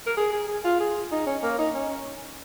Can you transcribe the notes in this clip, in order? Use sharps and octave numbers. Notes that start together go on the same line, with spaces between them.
A#4
G#4
G#4
G#4
F4
G#4
D#4
C#4
A#3
D#4
C#4